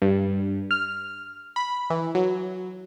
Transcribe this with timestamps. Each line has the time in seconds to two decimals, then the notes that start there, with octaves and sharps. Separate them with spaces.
0.02 G2
0.71 F6
1.56 B5
1.90 E3
2.15 F#3